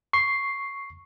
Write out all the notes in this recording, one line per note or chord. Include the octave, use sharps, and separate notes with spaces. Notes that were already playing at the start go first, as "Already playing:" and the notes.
C#6 C7